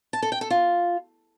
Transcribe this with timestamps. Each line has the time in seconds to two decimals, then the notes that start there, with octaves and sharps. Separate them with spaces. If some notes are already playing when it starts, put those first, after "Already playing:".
0.13 A5
0.22 A4
0.32 G5
0.41 A4
0.50 F4